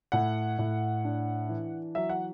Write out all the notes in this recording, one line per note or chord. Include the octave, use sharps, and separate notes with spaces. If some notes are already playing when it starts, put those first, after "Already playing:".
A2 F#5
A2
D4
E3
F#3 E5
F#5